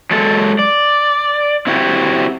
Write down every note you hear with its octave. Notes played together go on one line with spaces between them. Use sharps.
F#3 G#3 A4
D5
C4 E4 F#4 G4